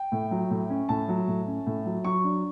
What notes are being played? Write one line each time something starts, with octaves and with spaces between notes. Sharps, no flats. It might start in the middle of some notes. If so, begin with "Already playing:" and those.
Already playing: G5
A2
F#3
A2
C#4
A2 A5
F#3
A2
C#4
A2
F#3
F#3 C#6
D4